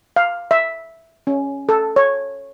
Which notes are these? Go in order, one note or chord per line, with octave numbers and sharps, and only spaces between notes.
F5
E5
C#4
A4
C#5